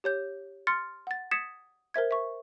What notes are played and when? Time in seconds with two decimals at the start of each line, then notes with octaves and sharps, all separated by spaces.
0.04 G4 C#5 G6
0.67 C6 F6 A6 C#7
1.07 F#5 A6
1.31 D#6 G#6 A6 B6 C#7 E7
1.94 A#4 C5 E5 G#6
2.11 E5 C#6